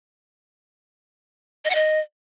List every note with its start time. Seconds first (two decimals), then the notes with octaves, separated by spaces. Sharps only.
1.65 D#5
1.70 F#5
1.75 D#5